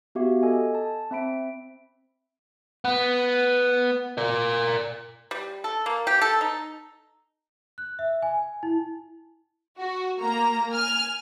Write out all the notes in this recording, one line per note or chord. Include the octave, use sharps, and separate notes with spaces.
B3 F#4 G4 E5 F5
A4 D#5 G#5
A5
C4 E5 B5 D7
B3
A#4 D5
G3
A4
A#3
G4
A4
D#4
F#6
E5
G#5
E4
F#4
A#3 A#5
G#5 F6